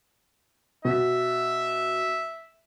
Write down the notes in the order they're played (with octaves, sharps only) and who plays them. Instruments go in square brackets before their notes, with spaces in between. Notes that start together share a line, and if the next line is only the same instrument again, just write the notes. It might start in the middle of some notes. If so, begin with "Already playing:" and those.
[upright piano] B2 [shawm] E5